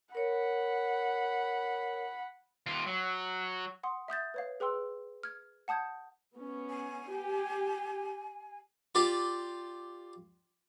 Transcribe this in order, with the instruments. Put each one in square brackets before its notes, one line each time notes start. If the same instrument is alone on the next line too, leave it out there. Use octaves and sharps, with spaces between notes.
[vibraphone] A#4 C#5 [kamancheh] F#5 B5
[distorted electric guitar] D#2 F4
F#3
[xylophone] F#5 C6 D#6
E5 D#6 G6 A6
B4 C#5 F5
G#4 B4 G5 C6 E6
F6 G#6
F#5 A5 D#6 G6 G#6
[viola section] B3 C#4
[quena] G#5
[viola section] G4
[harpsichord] F4 G4 D5